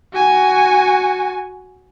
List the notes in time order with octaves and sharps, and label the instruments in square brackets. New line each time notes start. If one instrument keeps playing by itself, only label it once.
[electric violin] F#4 G#5